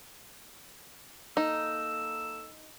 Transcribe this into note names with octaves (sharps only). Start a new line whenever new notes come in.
A#3 D#4 A4 E6